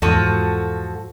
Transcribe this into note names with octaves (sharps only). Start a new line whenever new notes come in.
E2 G#2 F3 F#4 A4